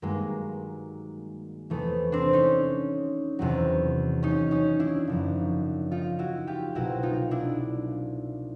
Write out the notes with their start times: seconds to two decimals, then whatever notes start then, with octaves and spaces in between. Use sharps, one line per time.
0.02 G2 D#3 F#3 G#3 A#3
1.70 E2 C3 E3 A3 B3
2.12 C4 D4
2.33 C#4 D#4
3.39 E2 C3 D#3 F#3
4.23 C#4 D#4
4.51 C#4 D#4
4.80 D4 E4
5.07 F#2 C#3 F3
5.92 D#4 F4
6.19 E4 F#4
6.47 F4 G4
6.75 C2 B2 F#3 E4 F#4
7.03 D#4 F4
7.31 D4 E4